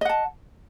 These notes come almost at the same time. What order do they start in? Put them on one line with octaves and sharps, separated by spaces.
D#5 F#5 A5